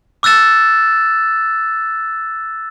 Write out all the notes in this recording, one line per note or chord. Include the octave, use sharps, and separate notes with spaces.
D6 E6 F#6 A6 E7